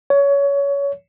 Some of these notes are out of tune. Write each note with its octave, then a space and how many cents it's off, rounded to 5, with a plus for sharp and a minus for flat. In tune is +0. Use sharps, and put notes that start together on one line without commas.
C#5 +20